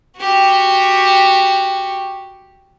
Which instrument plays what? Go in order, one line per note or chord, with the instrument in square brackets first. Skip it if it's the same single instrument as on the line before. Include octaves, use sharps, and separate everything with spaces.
[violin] F#4 G4